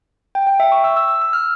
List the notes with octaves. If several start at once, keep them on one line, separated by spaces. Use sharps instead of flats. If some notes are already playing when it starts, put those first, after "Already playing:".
G5
G5
E5
C#6
E6
E6
E6
E6
F6